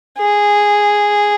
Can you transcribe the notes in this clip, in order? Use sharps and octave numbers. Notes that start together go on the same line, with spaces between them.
G#4